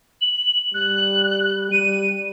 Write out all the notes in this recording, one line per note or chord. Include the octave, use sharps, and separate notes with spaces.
F#7
G3 F#6
G3 D#7